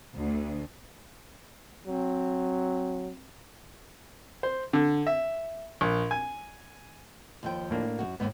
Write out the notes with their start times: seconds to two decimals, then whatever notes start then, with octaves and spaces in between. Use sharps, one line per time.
0.16 D2
1.87 F#3 C4
4.43 C5
4.73 D3
5.07 E5
5.81 A#1
6.11 G#5
7.43 D#2 F3 G5
7.70 A2 A#3 D4
7.99 F#2 F#4
8.20 D#2 G#2 B3